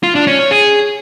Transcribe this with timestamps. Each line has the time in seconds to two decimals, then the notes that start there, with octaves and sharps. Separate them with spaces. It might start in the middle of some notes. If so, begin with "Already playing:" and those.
0.03 F4
0.15 D4
0.27 C#4
0.39 C#5
0.51 G#4